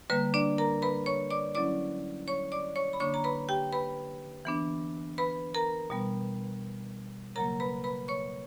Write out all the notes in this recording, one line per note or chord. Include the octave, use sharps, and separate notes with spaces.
D3 G3 A#3 B4
D4 D5
A#4 A#5
B4 B5
C#5 C#6
D5 D6
F#3 C#4 E4 D5 D6
C#5 C#6
D5 D6
C#5 C#6
B5
D3 A#3 D4 C#5 C#6
A#5
B4 B5
G4 G5
B4 B5
E3 B3 D4
B4 B5
A#4 A#5
B2 G3 B3
C#3 F#3 A#3 A#4 A#5
B4 B5
B4 B5
C#5 C#6